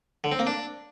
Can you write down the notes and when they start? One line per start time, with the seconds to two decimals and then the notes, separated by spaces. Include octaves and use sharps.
0.24 D3
0.32 C4
0.39 A#3
0.47 D4